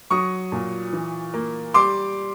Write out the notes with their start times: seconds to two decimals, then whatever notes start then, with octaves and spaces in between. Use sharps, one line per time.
0.10 F#3 C#6 D#6
0.52 A#2
0.93 E3
1.34 A#3
1.74 G3 C6 D6